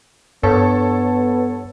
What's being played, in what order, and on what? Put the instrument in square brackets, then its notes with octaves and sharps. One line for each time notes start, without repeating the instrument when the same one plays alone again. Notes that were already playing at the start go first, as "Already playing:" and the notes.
[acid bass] G2 [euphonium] B3 [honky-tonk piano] A4 C#5